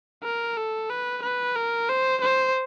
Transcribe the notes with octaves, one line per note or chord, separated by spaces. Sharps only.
A#4
A4
B4
B4
A#4
C5
C5